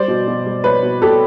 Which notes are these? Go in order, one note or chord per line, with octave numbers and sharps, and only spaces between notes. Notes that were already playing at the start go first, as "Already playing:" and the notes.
Already playing: G3 C5 D5
B2
B2
G3
G3 B4 C#5
B2
B2 G4 A4